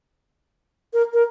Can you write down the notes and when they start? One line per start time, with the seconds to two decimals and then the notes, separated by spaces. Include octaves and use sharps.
0.94 A#4
1.14 A#4